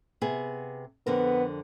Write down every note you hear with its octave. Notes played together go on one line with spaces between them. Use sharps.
C3 B3 G#4
F2 D3 B3 A#4